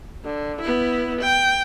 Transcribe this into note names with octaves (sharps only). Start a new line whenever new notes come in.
D3
B3 E4
G5